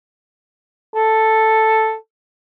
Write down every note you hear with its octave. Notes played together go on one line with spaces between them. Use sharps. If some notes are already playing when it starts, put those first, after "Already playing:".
A4